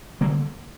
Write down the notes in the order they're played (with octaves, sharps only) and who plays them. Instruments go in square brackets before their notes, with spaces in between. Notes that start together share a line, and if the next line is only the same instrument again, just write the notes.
[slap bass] D3 G3 A#3